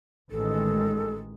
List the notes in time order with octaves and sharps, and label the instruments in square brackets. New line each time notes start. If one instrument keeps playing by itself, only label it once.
[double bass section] A1 D#3 G#3 [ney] A4